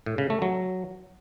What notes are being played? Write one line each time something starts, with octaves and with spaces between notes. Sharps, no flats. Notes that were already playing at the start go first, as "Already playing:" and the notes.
A2
C#3
A3
F#3